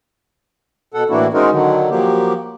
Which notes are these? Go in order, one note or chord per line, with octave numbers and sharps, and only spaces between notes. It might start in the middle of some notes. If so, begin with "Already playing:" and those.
B2 A4 F#5
A2 E3 A#3 D4 E4 F#4
G#3 C4 C#4 D#4 F#4 A#4
D3 D#3 F#3
F3 F#3 A#3 G4